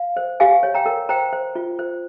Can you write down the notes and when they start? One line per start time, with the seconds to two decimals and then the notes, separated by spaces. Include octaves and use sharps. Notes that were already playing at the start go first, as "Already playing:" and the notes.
Already playing: F5
0.17 C5
0.40 G4 F5 G#5
0.63 C#5
0.74 G5 A#5
0.86 A#4
1.09 C5 G5 A#5
1.33 C5
1.55 F4
1.79 C5